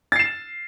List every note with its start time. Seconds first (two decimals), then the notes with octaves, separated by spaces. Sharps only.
0.12 A6
0.16 C7
0.19 E7